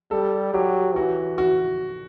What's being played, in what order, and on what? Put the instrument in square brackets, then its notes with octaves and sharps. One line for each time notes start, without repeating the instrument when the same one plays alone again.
[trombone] G3 [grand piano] A4
[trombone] F#3 [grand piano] G4
[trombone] E3 [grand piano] F#4
[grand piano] F#4